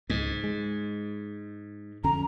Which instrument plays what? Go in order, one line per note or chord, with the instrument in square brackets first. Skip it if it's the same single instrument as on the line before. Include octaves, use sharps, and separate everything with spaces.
[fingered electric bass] C#2 G#3 [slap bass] G#2
[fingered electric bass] G#3
[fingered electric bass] F2 D3 C#4 [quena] A#5